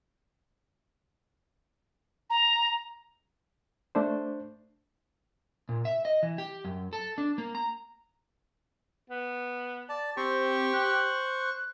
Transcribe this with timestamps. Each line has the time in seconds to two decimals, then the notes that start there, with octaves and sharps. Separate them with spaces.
2.30 A#5
3.95 A3 D4 C5
5.69 A#2
5.85 E5
6.05 D#5
6.23 E3
6.38 G4
6.64 F#2
6.93 A4
7.18 D4
7.38 A#3
7.55 A#5
9.10 B3
9.89 D5 A5
10.17 C4 G4 C5 C#6
10.73 F#6